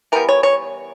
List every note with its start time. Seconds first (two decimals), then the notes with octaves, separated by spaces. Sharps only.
0.12 E3 G3 B3 A#4
0.29 C#5
0.43 C#5